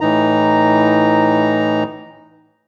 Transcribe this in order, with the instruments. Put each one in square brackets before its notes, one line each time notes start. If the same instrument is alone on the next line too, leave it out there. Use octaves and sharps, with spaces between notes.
[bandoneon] A2 E3 D#4 A#5